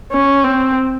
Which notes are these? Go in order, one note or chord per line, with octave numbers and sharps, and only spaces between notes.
C#4
C4